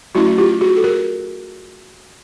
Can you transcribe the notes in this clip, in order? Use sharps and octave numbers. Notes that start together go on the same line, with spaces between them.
F#3 A3 C#4 E4 F#4
F4 G4
F#4 G#4
A4
G#4 A#4